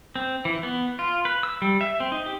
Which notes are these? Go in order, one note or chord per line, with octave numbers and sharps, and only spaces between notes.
C4
E3
B3
F4
B4
E6
G3
E5
C4
D#4
G4